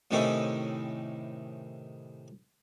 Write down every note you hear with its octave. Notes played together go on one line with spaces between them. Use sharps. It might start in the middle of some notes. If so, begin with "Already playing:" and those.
A2 C3 D#3 C#4 D#4 E4